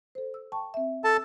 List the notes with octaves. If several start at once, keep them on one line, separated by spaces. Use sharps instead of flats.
A4 C5
E6
G5 A5 C#6
C4 E5
A4 A5